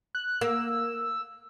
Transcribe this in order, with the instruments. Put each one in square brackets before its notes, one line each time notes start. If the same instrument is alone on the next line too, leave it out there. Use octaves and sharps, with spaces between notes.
[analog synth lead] F#6
[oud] A#3 [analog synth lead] E6